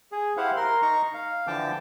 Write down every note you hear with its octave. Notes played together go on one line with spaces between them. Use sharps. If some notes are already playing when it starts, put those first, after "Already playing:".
G#4
E4 G4 C5 F5 F#5
A#4 C6
D#4 A#5 C#6
F5
D3 E3 F3 G5 A5 D6